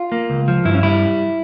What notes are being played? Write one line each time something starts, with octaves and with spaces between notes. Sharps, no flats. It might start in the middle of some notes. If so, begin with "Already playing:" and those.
Already playing: F4
A#3
C#2
F3
G2 E4
C#4
G3 E4